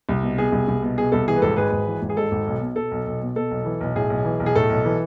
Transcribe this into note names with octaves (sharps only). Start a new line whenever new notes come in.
C2
B2
B2 G#4
C2
C2
B2
B2 G#4
C2 A4
E3 G#4
B4
G#1 A4
G#2 G#4 B4
G#1
E3
G#1
G#4
G#2 A4
G#1
B1
B2
B2 A4
B1
B1
B2
B2 A4
B1
E3
B1
A2 G#4
B1
E3
B1
G#4
A2 A4
B1
E3